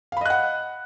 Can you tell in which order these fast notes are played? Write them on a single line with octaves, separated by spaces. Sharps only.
F5 B5 D#5 F#6 F#5